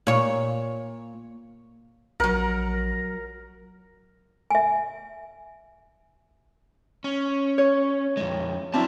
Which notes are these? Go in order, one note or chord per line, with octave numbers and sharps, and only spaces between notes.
A#2 C#5
A#1 F#3 A#4 F#5
E5 G#5
C#4
C#5
F2 G#3
F#3 C4 D4 E4 A5